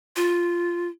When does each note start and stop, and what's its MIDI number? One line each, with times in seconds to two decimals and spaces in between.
0.16 0.88 65